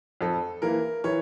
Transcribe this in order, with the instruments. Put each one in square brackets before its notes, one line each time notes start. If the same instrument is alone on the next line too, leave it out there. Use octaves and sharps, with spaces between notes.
[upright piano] F2 [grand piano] A4
[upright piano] E3 A#3 [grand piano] A#4
[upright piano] E3 [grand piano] C#5